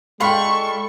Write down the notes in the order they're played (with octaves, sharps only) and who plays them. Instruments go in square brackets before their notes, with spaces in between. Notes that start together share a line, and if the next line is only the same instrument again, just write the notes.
[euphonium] G#3 [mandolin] D4 F4 A4 [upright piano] G5 B5 [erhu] C#6